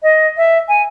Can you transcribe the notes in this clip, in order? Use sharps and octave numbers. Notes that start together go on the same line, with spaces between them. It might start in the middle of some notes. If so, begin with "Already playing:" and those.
D#5
E5
G#5